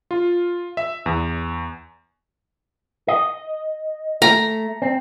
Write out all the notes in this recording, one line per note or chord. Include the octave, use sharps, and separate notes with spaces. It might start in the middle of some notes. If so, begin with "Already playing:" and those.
F4
E5
E2
D#5
A3 A#5
C4